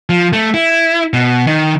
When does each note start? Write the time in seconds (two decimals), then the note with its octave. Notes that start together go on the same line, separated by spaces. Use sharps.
0.09 F3
0.33 A3
0.54 E4
1.13 B2
1.47 D#3